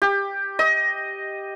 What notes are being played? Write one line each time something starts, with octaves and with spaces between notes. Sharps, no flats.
G4
D#5